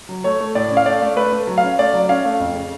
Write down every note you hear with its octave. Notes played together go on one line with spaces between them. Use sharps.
F#3
A3 C#5
A3
A2 D5
C#4
F5
A3 D5
A3
A3 B4
A3
F#3
F5
C#4
A3 D5
F#3
C#4 F5
A3
F2
C#3